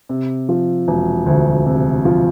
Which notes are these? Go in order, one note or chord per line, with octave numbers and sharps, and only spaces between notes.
C3
F3
E1
D2
C3
F3